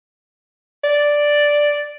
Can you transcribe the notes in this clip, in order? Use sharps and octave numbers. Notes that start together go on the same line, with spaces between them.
D5